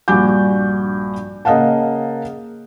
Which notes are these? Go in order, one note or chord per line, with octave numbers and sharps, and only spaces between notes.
A#1 G2 F#4 G#5 D6 G6
C#3 A#3 D#5 F5 F#5 A5